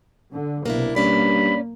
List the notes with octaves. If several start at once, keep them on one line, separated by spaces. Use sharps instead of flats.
D3
B1 C3 A#3 D4 E4
G2 A#3 C#4 D5 B5